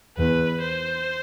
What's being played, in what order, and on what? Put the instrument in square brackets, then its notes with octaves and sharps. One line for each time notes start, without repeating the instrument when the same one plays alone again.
[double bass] E2 [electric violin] B4
[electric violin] C5